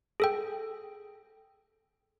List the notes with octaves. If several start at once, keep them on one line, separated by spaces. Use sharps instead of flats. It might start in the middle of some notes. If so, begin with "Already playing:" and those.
G#4 A4 G5